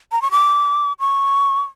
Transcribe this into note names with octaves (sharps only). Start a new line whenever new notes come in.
A#5
C#6
D6
C#6